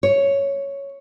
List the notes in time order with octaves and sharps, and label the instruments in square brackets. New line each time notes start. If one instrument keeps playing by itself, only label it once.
[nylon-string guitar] C#5